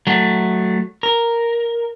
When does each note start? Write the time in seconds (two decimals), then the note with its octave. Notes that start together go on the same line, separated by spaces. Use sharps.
0.07 F#3 A3
1.03 A#4